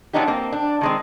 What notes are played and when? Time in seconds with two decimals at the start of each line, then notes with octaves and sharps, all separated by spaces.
0.13 F3 F#3 B3 D4 D#4 G4
0.28 A#3 C4
0.52 D4
0.81 D#3 G#3 C4